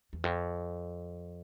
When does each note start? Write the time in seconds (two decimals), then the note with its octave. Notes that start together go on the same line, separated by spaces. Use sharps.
0.13 E2
0.24 F2